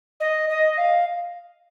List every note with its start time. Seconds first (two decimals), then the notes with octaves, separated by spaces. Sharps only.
0.20 D#5
0.49 D#5
0.78 F5